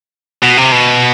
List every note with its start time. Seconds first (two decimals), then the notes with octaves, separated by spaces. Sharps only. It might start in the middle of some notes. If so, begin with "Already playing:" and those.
0.43 B2
0.57 C3
0.72 B2